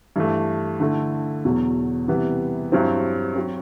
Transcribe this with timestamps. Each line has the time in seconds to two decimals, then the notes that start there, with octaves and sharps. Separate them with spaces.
0.16 G2 E3 A3
0.80 D3 A3 E4
1.45 E2 B2 F#3
2.08 C3 E3 G3 B3
2.72 G2 F#3 C4 E4
3.36 F#3 C4